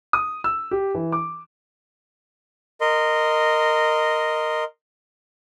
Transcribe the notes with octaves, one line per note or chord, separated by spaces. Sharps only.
D#6
E6
G4
E3
D6
A#4 D#5 C6